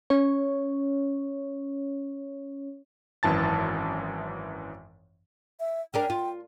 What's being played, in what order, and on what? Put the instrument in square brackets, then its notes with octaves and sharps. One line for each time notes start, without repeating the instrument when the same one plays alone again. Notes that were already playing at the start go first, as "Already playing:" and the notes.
[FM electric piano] C#4 C#5
[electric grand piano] G#1 F#2 E3 A5 A6
[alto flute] E5
[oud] C#4 D4 A#4 [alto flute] G5
[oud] F4